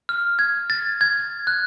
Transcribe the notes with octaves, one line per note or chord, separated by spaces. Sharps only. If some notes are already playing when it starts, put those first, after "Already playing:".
F6
G#6
A6
G#6
F#6